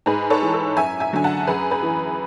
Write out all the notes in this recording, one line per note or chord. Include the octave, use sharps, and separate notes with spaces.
G#2 G#4 B4
A4 C#5
E3
A4
F#2 E5 G#5
E5 G#5
D3 F#3 G#5
F#5 A5
F#2 G#4 B4
G#4 B4
E3